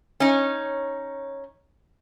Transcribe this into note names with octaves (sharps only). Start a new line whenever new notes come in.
C#4 D#4